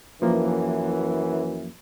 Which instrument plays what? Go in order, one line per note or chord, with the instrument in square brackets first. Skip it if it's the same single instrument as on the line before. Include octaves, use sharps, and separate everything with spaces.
[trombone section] F#2 E3 [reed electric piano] F3 A#3